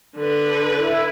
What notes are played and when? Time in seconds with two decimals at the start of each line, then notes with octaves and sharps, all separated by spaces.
0.17 D3 B4
0.77 E4